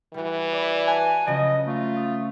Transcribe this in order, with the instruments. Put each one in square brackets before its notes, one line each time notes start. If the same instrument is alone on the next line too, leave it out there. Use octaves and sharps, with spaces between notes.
[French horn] E3 [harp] G3 F#4
[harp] D5 B5
[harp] B4 F#5 A5 [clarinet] G#5
[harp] C#3 F3 F#3 [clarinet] D#5
[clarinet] A3 [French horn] F4
[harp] D#6